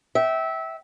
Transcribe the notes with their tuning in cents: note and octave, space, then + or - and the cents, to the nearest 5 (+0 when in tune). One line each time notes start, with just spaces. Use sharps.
E5 -20 G5 -25